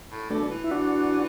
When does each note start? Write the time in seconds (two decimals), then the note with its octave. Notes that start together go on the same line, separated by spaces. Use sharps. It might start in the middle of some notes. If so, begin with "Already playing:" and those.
0.11 A2
0.30 B2 A3 D4
0.50 E3
0.64 E4
0.71 D4 F#4